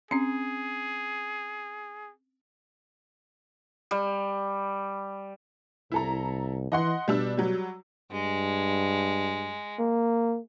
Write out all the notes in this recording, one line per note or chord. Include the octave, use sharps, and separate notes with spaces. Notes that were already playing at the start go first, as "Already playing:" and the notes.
C4 C#4 G#4
G3
C2 E4 A4 A#5
E3 D#5 F#5 C6
B2 G3 D4 E6
F#3 G3
G2 G#3
A#3